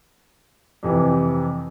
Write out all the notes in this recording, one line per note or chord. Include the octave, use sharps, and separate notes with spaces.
F2 C3 E3